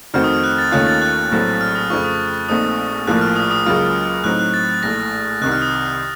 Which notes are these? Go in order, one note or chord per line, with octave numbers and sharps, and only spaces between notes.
F2 D#3 A3 C4 F#4 F6
D#6
F6
F#6
A6
D#2 D#3 A3 C#4 F4 F#6
A6
F#6
A#1 A2 F#3 A3 C4
F6
D#6
F2 C#3 A3 C4 F4 C#6
D#6
A#1 A#2 A3 C4 D#4 D#6
A#1 A2 F3 A#3 F#6
F6
D#6
D#6
C#2 C#3 F#3 A#3 F4 F6
A2 F#3 C4 D#4 F#6
F#6
A6
A6
A#1 A2 A3 A#6
C2 C3 D#3 F#6
F6
D#6